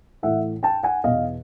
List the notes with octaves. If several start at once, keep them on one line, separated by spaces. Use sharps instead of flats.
A2 E3 E5 F#5
G5 A5
F#5 G#5
E2 B2 D#5 F5